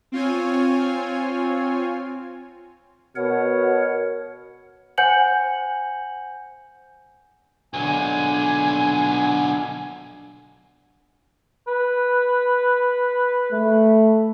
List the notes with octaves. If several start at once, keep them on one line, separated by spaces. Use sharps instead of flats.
C4 F4 C#5 G#5
B2 A#4 C#5 F#5
C5 F#5 G#5 G6 C#7 F#7
B1 D3 G#5
B4
A3